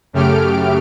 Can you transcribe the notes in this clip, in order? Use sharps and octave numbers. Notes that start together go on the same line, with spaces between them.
F#2 C#3 A3 G4 F6 D7